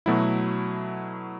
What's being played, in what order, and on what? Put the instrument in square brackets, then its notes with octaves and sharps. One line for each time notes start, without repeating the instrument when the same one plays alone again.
[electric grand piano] B2 F#3 A3 E4